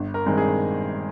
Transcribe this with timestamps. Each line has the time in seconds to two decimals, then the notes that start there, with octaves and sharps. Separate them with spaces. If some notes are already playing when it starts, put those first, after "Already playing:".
Already playing: G1
0.14 A#4
0.26 G2 D#3 G#3 C4
0.37 G#4